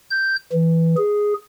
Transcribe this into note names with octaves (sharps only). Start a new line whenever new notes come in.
G6
E3
G#4